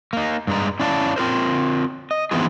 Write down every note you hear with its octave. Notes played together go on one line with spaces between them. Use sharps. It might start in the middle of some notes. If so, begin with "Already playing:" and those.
A#3 D#4
G2 G#3 A#5
C#4 E4 D5 F5 G#5 A5
C4 F4 A#4 C5
D#5
E3 B3 C4 D#4 F4 G#4